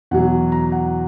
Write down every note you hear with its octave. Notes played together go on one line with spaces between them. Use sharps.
E2 B2 F#3 F#5
A#5
F#5